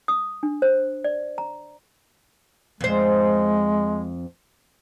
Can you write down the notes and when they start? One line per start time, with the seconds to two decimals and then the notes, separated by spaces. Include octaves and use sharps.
0.08 D#6
0.43 D4
0.62 C5
1.04 D5
1.38 A#5
2.81 F2 G#3 C5